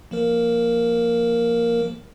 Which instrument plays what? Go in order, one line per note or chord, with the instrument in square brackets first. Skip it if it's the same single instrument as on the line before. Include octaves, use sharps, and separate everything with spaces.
[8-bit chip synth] F3 A#3 A#4